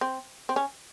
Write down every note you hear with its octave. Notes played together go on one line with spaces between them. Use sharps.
C4
C4
C#4